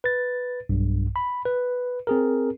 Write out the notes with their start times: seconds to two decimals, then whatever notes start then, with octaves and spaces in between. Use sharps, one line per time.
0.04 B4 A6
0.69 B1 G2
1.16 B5
1.45 B4
2.07 C4 G#4 A#4